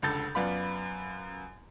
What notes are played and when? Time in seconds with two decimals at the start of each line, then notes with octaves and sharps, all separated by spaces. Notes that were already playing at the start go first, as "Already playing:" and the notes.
0.02 F1 C#2 D3 A4 G6 A6
0.35 F#2 B3 F4 D5 B5